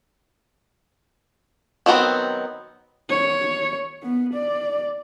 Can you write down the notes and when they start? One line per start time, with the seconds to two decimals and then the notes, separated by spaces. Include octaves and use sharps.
1.86 D#3 F#3 B3 C4
3.10 C#5
4.02 B3
4.34 D5